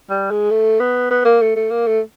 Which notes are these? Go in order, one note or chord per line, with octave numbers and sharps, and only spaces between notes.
G3
G#3
A3
B3
B3
A#3
A3
A3
A#3
A3